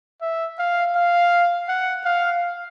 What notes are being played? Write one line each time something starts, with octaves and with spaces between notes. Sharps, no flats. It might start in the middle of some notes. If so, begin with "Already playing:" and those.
E5
F5
F5
F#5
F5